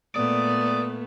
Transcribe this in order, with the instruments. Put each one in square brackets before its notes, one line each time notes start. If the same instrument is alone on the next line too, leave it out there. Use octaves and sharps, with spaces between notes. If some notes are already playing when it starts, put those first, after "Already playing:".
[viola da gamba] A#2 [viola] A3 B3 [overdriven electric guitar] D5 [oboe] D#6